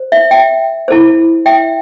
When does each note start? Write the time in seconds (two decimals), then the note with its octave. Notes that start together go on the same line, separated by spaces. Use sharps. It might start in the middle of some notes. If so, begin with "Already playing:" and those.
Already playing: C5
0.12 E5
0.31 E5 G5
0.88 E4 A4 C5
1.46 E5 G5